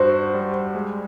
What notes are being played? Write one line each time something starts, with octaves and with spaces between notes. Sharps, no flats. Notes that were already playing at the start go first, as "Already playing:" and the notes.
Already playing: G2 F#4 C5
G3
G#3